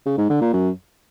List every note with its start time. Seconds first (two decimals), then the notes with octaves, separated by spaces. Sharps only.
0.06 C#3
0.18 G#2
0.30 D3
0.41 A#2
0.53 F#2